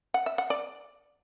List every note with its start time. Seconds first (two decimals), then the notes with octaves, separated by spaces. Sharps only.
0.14 F#5
0.26 E5
0.38 F#5
0.50 D5